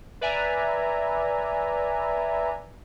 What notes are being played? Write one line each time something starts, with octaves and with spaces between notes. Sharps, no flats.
B4 D5 E5 G#5 A#5